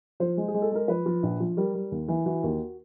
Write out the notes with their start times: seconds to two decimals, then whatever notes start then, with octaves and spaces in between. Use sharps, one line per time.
0.20 F3 C5
0.37 G#3
0.48 G#4
0.54 G#3
0.62 A4
0.71 G#3 A#4
0.88 F3 B4
1.06 F3
1.23 A#1
1.40 F3
1.57 G3 A#4
1.75 G3
1.92 D#2
2.08 E3
2.26 E3 F#4
2.43 D#2